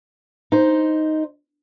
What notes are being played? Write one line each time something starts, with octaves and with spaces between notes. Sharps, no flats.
D#4 C5